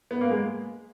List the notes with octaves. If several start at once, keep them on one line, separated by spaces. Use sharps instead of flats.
B3
A#3
G#3